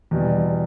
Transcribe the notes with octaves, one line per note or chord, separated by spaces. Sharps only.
E2 B2 G3